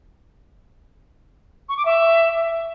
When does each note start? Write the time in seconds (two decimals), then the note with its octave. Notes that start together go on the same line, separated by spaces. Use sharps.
1.69 C#6
1.77 D6
1.85 E5